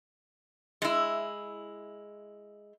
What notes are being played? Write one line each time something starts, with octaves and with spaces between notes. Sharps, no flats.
G#3 E4